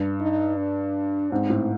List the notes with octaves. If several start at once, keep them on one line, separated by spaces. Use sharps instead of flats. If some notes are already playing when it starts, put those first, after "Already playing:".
Already playing: G2
D#4
D4
G#2 C4
A2